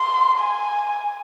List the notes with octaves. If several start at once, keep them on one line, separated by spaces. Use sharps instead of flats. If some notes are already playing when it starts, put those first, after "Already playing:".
Already playing: C6
G#5